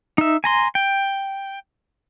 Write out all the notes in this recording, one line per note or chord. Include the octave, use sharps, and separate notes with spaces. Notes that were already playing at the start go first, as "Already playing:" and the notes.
D#4 E5
G#5 A#5 C6
G5